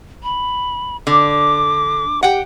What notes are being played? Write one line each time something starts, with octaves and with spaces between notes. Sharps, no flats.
B5
D3 D6
G4 F#5 G5